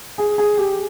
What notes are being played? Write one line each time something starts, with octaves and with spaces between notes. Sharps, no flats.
G#4
G#4
G4